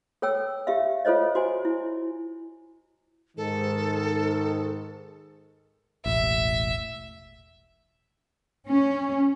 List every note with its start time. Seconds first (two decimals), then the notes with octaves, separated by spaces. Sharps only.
0.22 A4 C#5 G5 E6
0.67 G4 E5 F5
1.05 F4 A4 C5 C#5 D#5
1.35 F#4 C5 G#5
1.65 E4
3.37 G#2 D#3 A4
6.06 E1 A1 E5
8.66 C#4